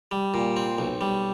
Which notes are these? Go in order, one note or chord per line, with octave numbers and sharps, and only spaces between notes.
G3
A#2
C4
B1
G3